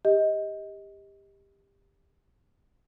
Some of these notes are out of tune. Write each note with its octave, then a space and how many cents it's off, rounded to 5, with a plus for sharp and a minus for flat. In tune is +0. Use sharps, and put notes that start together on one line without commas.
G4 +20 D#5 +20